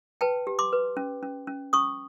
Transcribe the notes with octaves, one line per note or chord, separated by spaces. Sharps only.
B4 G5 A5
G4
C6 D6
B4
C#4
C#4
C#4
C#4 C#6 D#6